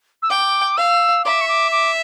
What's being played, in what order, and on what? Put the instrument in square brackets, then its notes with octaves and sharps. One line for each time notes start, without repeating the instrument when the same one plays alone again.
[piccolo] E6
[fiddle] G5 [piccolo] D6
[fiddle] F5 [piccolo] E6
[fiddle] E5 [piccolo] D6
[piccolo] C#6
D6
D6